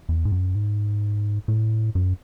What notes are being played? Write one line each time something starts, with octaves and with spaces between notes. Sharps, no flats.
E2
G#2
F#2
G#2
A2
F#2